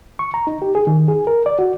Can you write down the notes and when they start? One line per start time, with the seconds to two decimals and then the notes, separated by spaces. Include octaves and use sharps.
0.19 C#6
0.34 A#5
0.47 D#4
0.62 G4
0.75 G#4
0.87 D#3
1.08 G#4
1.27 A#4
1.46 D5
1.59 F#4